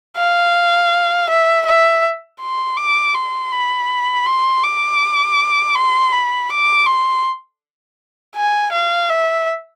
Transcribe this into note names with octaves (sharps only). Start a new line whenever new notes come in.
F5
E5
E5
C6
D6
C6
B5
C6
D6
C6
B5
D6
C6
G#5
F5
E5